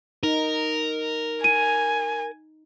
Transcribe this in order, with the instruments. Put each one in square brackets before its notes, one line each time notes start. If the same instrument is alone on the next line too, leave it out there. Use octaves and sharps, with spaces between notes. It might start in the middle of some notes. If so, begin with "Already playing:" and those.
[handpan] D#4 [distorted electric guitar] A#4
[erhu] G#5 [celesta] D#7